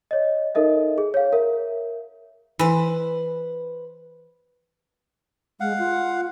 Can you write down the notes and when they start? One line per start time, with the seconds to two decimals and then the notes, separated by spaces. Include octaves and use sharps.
0.11 C#5 D#5
0.55 D#4 A4 A#4 D#5 E5
0.98 G#4
1.14 C#5 F5
1.33 A#4 E5
2.59 E3 B4 C5
5.60 G#3 F5 F#5
5.79 F4